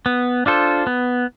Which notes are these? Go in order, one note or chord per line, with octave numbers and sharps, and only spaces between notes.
B3
D4 F4 A4 C5
B3